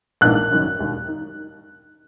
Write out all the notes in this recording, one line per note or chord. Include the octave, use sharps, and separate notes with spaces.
A#1 G#2 E3 A#3 F#6
F#1 F#2 D#3
E1 D#2 D#3
D#4